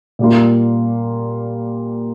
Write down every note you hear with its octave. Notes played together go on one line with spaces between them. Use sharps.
A#2 G3 A#3 F4